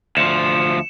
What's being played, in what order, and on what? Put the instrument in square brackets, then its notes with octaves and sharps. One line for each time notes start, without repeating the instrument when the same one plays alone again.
[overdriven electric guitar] D2 F3 [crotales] C#7 E7